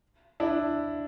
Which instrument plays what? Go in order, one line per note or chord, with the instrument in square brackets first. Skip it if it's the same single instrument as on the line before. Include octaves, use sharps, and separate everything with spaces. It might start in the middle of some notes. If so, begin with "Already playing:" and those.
[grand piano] D4 E4